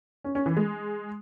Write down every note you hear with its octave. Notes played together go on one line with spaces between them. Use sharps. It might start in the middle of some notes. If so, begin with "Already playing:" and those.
C#4
C#4
E3
G#3